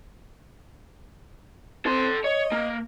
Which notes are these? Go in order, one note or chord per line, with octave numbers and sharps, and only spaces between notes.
C4 A4 C6
C#5 D#5
A#3